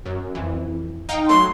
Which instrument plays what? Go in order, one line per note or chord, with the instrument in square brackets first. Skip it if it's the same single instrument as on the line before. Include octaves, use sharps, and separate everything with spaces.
[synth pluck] F#2
F2 E3
D#4 F5 G5
[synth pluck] F#3 A3 [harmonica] C6